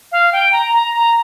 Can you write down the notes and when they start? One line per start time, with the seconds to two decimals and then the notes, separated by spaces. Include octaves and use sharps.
0.12 F5
0.32 G5
0.53 A#5
0.73 A#5
0.94 A#5